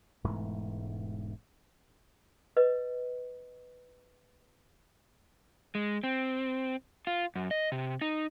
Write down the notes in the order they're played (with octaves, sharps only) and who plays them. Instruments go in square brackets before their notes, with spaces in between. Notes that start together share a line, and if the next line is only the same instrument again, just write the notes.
[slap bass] E1 G#2 E3 A3
[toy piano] B4 D#5
[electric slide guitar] G#3
C4
F4
F#2
D#5
C3
D#4